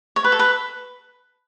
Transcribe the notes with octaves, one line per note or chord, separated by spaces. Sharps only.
C#5
B4
A4
B4